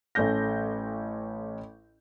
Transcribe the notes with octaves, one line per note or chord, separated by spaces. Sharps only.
A1 A3 C#4 G6 A#6